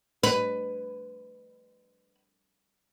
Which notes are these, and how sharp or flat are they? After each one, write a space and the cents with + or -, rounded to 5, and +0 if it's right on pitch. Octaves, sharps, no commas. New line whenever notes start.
B4 +15